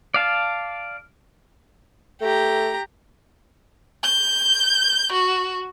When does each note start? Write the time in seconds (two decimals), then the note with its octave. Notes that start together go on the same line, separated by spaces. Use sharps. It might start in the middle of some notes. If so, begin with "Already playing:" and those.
0.14 D5 F5 A5
2.21 A3 G4 A#5
4.03 G6
5.13 F#4